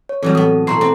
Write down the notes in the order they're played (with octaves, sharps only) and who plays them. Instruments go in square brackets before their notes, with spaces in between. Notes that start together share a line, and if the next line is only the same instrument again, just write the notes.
[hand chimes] C#5
[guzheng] E3 F#3 G3 [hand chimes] C4 A4
[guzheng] A2 B3 [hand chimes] A4 D#6
[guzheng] B2 A3 E4 [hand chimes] A#5 C6 C7
[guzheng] C4 B4 D5